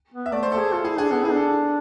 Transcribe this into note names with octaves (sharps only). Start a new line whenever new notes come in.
B3
E5
A3 D5
A3 C5
A4
G#4
F4 A4
E4 G#4
D4 G#4
B3 A4
E4 G#4
D4
A4